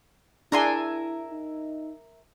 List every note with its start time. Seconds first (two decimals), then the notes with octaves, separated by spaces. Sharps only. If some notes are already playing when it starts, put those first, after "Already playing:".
0.52 D4 E4 G#4 A#4 E5 G#5 C6
1.32 D#4